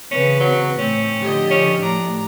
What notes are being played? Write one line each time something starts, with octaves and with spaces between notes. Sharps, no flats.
C#3 E3 C4 C#4 B4
F#3
A2 C4 C#4
D3 F3 G4 D#5
C#4
A2 D4 A#5